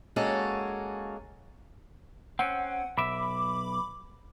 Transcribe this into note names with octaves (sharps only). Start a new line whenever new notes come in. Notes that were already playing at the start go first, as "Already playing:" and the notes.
G#3 A#3 C#4 F#4 A4
C4 C#4 F#5
B1 E5 B5 D6